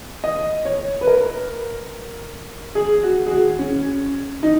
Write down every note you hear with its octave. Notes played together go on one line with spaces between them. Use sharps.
D#5
C#5
B4
A#4
G#4
F#4
G#4
F#4
C#4
D#4